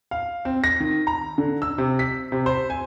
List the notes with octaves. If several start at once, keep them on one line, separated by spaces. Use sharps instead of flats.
F5
C4
A#6
D#3
A#5
D3
E6
C3
B6
C3
C5
G#5